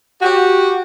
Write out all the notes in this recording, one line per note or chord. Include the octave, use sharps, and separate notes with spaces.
F#4 G4